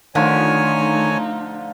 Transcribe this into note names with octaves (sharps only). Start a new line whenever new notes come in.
D3 D#3 F3 A3 D#4 F4 C#5 G#5